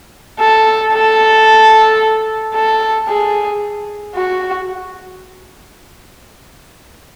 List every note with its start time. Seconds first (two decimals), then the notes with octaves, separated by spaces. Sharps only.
0.40 A4
0.94 A4
2.55 A4
3.09 G#4
4.16 F#4